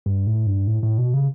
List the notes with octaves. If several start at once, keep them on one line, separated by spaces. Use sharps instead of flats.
G2
A2
G2
A2
A2
B2
C#3